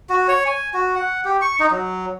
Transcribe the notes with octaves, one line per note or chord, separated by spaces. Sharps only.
F#4
C#5
G#5
F#4
F#5
G4
C#6
D#4
F#3